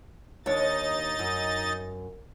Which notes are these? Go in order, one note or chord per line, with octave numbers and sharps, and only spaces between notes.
D#2 D4 D#4 C#5 D#5 A6
F#2